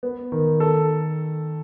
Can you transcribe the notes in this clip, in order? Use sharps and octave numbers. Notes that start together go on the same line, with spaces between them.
B3
D#3
A4